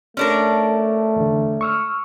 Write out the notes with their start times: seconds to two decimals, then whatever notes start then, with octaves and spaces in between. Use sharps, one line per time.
0.17 A3 C#4 D4 A#4
1.16 E2 D3
1.61 C#6 E6 F6